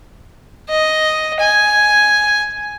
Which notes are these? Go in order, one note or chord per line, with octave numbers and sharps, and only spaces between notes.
D#5
G#5